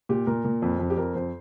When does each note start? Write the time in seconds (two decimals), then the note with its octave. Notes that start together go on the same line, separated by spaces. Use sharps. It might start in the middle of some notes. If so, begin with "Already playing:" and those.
0.09 A#2 G4
0.27 A#2 A#4
0.45 A#2
0.62 F2
0.79 F2
0.90 G4
0.97 F2 A#4
1.15 F2 C5